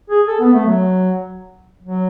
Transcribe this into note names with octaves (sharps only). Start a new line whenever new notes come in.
G#4
A4
B3
A3
F#3
F#3